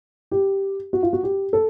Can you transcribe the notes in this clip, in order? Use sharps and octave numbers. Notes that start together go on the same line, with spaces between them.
G4
F#4
F4
F#4
G4
A4